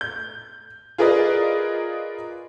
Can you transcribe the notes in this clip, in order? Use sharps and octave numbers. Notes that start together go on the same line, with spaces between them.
G6
F4 G#4 A#4 B4 D5 D#5